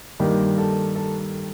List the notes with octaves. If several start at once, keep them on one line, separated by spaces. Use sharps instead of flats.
G2 D#3 G3 A#3 G4
A4
A4